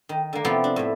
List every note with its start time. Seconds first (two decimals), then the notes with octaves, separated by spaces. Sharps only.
0.09 D#3
0.33 D3 A#3
0.45 C3 F3 B3 E4 G5 A5
0.64 D4
0.76 A2 E5